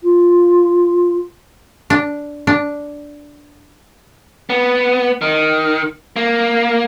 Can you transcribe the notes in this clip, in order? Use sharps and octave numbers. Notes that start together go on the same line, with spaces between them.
F4
D4
D4
B3
D#3
A#3